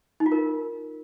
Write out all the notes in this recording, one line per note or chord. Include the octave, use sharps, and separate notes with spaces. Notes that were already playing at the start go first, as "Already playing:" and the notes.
D#4
F4
A#4